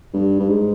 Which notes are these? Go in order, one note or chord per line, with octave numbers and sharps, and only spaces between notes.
G2
G2
G#2